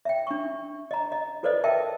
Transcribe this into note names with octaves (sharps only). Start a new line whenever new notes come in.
E5 G5
D4 C#6
D#5 A#5
D#5
F4 A4 B4 C5 D5 D#5
A#4 D#5 E5 G5 A5